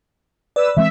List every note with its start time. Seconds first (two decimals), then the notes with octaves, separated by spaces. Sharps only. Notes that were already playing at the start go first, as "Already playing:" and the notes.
0.56 B4 D5 E6
0.77 E3 G#3 C4 E5